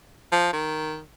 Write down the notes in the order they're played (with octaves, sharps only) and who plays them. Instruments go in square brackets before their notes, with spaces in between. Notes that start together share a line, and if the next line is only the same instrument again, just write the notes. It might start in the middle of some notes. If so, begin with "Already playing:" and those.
[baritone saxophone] F3
D#3